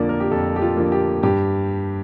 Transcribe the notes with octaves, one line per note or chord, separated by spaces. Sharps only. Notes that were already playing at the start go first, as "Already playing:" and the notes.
Already playing: F2 D3 F3 A#3 D5
A#4
G4
F2 A4
G4
F4
D3 F3 A#3
G4
G2 G4